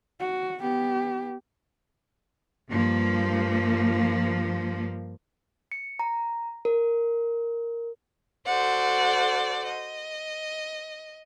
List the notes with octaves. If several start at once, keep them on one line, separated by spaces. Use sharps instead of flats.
F#4
B3 G4
G2 F3 A#3
C#7
A#5
A#4
F#4 A4 C5 D5 F#5
D#5